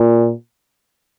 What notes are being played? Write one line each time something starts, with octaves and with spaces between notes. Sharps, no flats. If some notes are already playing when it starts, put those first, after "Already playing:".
Already playing: A#2